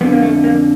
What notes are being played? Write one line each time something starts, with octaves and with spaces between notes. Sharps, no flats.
F2 D3 B3
A#3
A3
A#3